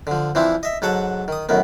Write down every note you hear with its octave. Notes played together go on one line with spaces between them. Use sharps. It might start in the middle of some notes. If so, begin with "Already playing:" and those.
D3 F3
E3 F3 C4 D4 E4
D#5 E5
G#2 F#3 A4 F#5 A5
D#3 D#6
F#2 A2 D#3 B3